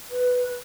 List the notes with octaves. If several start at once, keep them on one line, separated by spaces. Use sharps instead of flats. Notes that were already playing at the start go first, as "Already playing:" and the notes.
B4